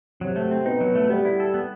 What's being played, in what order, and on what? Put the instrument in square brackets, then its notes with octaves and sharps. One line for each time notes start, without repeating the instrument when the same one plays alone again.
[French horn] C3 [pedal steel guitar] F#3
[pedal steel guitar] A3
C4
[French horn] B2 [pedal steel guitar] D#4
[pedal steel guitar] F#3
A3
[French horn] G3 [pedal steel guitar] B3
[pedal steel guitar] E4
A4
B3